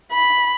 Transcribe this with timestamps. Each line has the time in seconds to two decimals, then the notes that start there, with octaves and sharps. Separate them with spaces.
0.12 B5